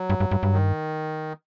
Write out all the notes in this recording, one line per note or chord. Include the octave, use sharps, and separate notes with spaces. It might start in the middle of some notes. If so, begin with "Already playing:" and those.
Already playing: F#3
G2
G2
G2
G2
D#3